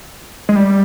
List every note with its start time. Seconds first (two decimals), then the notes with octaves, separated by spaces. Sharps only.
0.49 G#3
0.56 G3